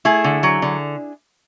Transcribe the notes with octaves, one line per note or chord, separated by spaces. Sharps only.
A3 E4 G#4
D3
F#3
D3